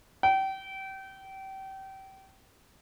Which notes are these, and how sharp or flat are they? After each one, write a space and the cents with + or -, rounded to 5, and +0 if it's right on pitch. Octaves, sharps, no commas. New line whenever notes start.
G5 -30